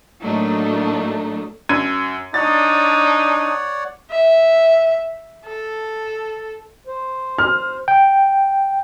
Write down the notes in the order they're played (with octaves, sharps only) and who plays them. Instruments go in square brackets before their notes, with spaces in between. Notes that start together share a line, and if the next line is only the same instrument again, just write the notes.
[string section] A2 F#3 A3 A#3 D4 D#4
[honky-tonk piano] F#2 G#6 D#7
[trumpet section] D4 D#4 [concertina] C#5 D5 F#5 [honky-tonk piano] A6
[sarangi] E5
A4
[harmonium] C5
[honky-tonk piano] F6
[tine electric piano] G5